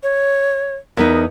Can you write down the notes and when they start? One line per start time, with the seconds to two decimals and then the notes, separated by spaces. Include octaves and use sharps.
0.03 C#5
0.97 E2 B3 D#4 A#4